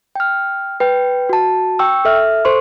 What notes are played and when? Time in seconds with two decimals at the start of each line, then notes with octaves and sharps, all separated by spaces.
0.15 G5 F6
0.80 B4 G5
1.29 F#4 A5
1.79 G5 C#6 E6
2.05 A4 E5 F6
2.45 A4 C5 C6 C#6